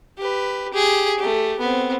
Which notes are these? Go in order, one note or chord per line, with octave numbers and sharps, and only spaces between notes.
G4 B4
G4 G#4
A3 G4
B3 C4